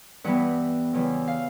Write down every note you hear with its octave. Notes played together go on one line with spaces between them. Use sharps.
G2 E3 G3 B3 F#5
E2 C#3 E3 G3
F5